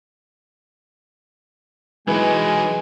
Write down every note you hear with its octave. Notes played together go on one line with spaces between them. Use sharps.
E3 F#3 G#3 D#4 G#5